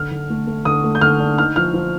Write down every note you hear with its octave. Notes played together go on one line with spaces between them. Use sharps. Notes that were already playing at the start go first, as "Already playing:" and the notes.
Already playing: D3 F6
D3
A3
A3
D3 D#6
A3
G6
D3 F6
D4
D#4 F6
F3 F6
F3